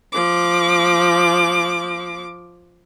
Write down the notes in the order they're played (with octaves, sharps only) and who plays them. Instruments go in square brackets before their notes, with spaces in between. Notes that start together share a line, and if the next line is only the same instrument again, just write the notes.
[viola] F3 D6